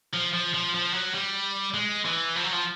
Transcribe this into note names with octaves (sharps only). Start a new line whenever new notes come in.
F3
F3
F3
F3
F#3
G3
G#3
E3
F3
F#3
F3